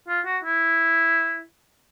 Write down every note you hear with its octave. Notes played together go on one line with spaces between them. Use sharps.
F4
F#4
E4